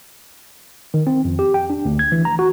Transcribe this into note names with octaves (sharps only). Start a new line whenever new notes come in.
D#3
C4
F2
G4
G5
D4
D2
G#6
E3
A#5
F#4